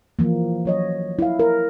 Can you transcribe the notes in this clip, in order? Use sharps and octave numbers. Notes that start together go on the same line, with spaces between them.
E3 F3 A#3
F#3 C#5 D#5
E4 F5
A#4